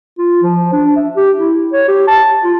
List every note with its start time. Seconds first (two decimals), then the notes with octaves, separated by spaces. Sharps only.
0.18 F4
0.43 F3
0.73 D4
0.96 E5
1.16 G4
1.37 E4
1.73 C#5
1.88 G4
2.07 A5
2.44 F4